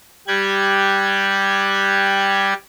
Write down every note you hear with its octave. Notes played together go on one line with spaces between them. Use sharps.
G3 G4 F#6 G#6